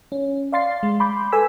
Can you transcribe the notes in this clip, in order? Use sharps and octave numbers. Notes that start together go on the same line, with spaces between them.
C#4
D5 F5 C6 A6 C7
G#3
B5 C6 D6 G6
A4 B4 G#5 E6 B6